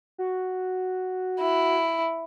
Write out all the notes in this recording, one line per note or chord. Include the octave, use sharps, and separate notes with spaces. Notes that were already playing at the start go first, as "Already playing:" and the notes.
F#4
E4